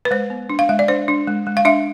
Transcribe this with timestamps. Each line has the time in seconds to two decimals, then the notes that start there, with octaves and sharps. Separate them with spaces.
0.05 B4
0.11 G#3 C5
0.30 B3
0.50 D4
0.59 F5
0.69 G#3 E5
0.79 D5
0.88 D4 C5
1.08 D4
1.27 G#3
1.47 G#3
1.57 F5
1.65 D4 E5